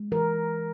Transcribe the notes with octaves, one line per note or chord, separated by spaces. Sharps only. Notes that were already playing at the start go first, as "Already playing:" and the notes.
Already playing: G#3
E3 A#4